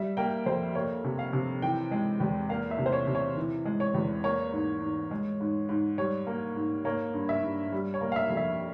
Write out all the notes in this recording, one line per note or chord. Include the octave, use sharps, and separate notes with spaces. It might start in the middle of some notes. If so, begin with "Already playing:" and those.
Already playing: G3 E5
A#3 G5
F2 C5
A#3 C#5
C3
F5
C3
E3 G5
G#3
E2
A#3 F5
E5
C3
C5
C#5
C3
C#5
E3
G#3
C#5
E2
A#3 C#5
G#2
G#2
G#3
G#2
G#2
G3 C#5
A#3
G#2
A#3 C#5
G2
E5
G2
G3
C#5
A#3
F5
E5
F2
E5